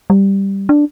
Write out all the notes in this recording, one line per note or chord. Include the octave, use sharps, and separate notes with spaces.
G3
D4